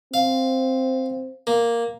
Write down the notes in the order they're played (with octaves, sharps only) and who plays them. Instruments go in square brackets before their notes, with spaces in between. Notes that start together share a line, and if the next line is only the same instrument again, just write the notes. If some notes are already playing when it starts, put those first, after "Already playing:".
[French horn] C4 [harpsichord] F5
[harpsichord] A#3